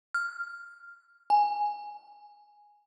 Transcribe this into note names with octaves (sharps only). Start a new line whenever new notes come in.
F6
G#5